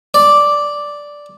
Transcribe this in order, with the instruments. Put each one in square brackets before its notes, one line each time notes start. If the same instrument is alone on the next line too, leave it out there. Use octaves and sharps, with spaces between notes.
[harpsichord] D5